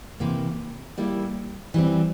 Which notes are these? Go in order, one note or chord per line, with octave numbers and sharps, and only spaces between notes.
C3 E3 A#3
G3 A#3 E4
E3 G3 C4